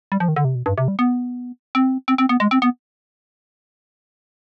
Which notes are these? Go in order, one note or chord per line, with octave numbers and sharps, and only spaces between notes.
G3
F3
D#3
D3
C3
B2
G2
C3
G3
B3
C4
C4
C4
B3
G#3
C4
B3